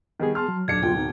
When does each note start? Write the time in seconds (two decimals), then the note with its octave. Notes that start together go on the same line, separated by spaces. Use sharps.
0.20 D#3 G3 B3 G#4
0.35 A5 C6 F6
0.48 F#3
0.68 D#1 D4 G#6 C#7
0.82 D1 B2 F4 G5
0.96 D#4